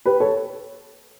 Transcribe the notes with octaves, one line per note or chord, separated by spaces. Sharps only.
G4 B4
A4 C#5